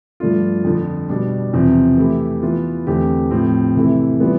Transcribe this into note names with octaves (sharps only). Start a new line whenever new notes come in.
G2 F3 A3 D4 F4
F2 D3 F3
B2 G3 D4
E2 C3 F3 C4
E3 A3 E4 G4
E3 B3 F4
E2 D3 A3 C4 G4
A2 F3 C4
C3 E3 A3 E4
E3 G3 B3 F4